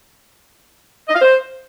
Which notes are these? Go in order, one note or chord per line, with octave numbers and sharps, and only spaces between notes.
D#5
F5
C5